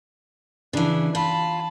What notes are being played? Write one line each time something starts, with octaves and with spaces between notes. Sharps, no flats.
C#3 E3 D4
F4 A5 B5